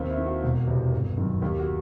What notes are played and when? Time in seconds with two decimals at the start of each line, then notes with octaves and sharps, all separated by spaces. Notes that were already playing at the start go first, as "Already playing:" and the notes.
Already playing: D#2 C4
0.10 E4
0.18 D#3
0.26 F#4
0.43 E1
0.68 E2 C3
0.92 G1
1.17 F#2 D#3
1.42 D#2 G4
1.59 F#4